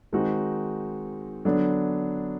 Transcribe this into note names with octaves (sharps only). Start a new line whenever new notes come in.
D#3 G#3 C4 D#4 F#4
D3 F#3 B3 D4